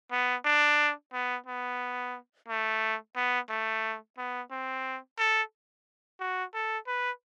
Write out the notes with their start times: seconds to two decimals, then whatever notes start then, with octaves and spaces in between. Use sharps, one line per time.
0.12 B3
0.45 D4
1.13 B3
1.47 B3
2.48 A3
3.16 B3
3.50 A3
4.18 B3
4.51 C4
5.19 A4
6.20 F#4
6.54 A4
6.87 B4